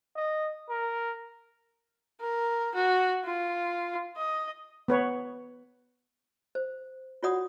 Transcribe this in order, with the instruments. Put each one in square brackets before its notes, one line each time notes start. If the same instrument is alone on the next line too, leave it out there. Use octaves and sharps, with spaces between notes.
[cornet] D#5
A#4
[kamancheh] A#4
F#4
F4
D#5
[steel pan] B3 B4 C#5
[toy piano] C5
F4 F#4 C#5 D5 F#5 D#6